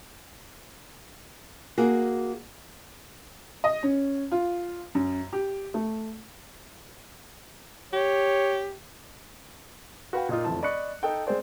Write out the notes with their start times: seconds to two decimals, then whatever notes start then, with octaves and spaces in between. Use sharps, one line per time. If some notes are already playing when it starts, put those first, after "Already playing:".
1.78 A#3 F#4 G#4
3.64 D#5
3.83 C#4
4.32 F4
4.95 F#2
5.33 G4
5.74 A3
7.93 G4 C#5
10.13 F#4 B4 F5 G5
10.29 A#2 D#4 F4
10.44 F1 E2 F3 E4 A5
10.63 D5 D#5 B5 C#6 F#6 C#7
11.03 D#4 A4 G5
11.27 G#3 C4 G#4 C5 D5